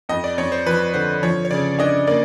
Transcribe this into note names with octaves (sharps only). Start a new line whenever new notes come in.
F2 D#5
D5
F2 C#5
C5
F3 B4
D3 C5
F3 C#5
C#5
C#3 D5
D4 D#5
A#3 D5